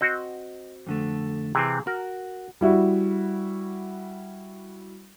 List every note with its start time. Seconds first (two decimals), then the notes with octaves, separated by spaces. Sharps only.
0.01 C4 F#4 D#5
0.87 F2 D3 A3
1.55 C3 E3 C4 G#4
1.87 F#4 A#4
2.61 G3 E4 F#4